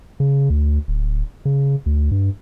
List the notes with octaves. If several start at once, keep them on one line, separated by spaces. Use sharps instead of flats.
C#3
D2
D1
C#3
D2
G2